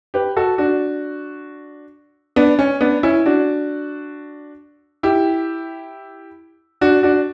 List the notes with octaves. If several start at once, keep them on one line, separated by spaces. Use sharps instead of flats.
G4 B4
F#4 A4
D4 F#4
B3 D4
C#4
B3 D4
C#4 E4
D4 F#4
E4 G4
D4 F#4
D4 F#4